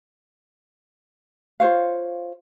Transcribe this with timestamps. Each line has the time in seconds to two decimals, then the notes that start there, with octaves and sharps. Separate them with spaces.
1.60 F4 C5 C#5 F5